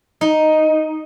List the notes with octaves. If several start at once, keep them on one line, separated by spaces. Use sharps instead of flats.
D#4